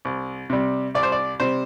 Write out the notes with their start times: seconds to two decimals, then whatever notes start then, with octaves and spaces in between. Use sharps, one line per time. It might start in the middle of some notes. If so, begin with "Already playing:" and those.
0.05 C2
0.50 C3 G3
0.95 C2 D5
1.03 C5
1.12 D5
1.40 C3 G3 C5